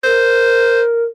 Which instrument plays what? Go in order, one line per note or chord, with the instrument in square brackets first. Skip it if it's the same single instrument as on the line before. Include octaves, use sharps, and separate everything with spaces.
[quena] A#4 [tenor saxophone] C5